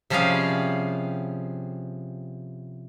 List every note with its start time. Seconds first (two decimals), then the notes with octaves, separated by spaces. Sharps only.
0.10 C3 F3 G3 C#4 G#4 F5